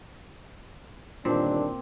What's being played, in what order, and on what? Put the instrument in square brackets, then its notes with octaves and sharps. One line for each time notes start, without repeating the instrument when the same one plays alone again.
[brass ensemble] G1 D#2 D4 [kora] A#2 C4